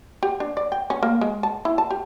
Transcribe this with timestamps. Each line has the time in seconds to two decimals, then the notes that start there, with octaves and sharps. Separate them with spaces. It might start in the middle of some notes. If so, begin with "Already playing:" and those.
0.23 G4
0.40 D4
0.57 D5
0.72 G5
0.90 C#4
1.03 A#3
1.21 G#3
1.43 A5
1.65 E4
1.78 A5
1.91 G4